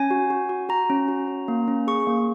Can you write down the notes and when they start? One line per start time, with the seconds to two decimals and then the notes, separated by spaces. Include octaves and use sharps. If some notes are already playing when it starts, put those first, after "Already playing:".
Already playing: C#4 G#5
0.11 F#4
0.30 F#4
0.49 F#4
0.69 F#4 A#5
0.90 C#4
1.08 F#4
1.28 C#4
1.48 A#3
1.68 C#4
1.87 G#4 C#6
2.07 A#3